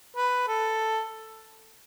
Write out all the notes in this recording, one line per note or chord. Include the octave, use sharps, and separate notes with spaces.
B4
A4